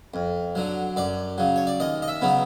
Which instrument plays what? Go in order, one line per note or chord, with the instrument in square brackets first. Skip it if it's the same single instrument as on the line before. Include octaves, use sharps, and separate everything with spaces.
[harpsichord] F2
D3 F#3
F#2 D5
C#3 F#3
C#5
D5
D#2 D#5
D#5
E5
C#3 F#3 B3